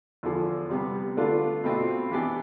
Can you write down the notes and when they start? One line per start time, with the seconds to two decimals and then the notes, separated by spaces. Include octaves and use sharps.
0.23 E2 D3 F3
0.69 C3 G3 B3
1.17 D3 A3 D4 F4 B4
1.64 B2 A3 C4 F4
2.12 E3 B3 D4 G4 D5